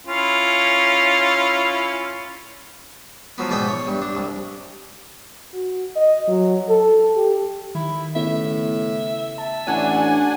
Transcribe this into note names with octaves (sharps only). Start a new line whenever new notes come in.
C#4 E4 F4
F3 F#3 B3
G#2 B2 D5 E5 G5 D#6
C#5
G2
D4
C2
F#4
D#5
F#3
A4
G4
D#3 E4
A2 C#3 B3 E5
E5 A5
A1 D4 C#5 F#5 G#5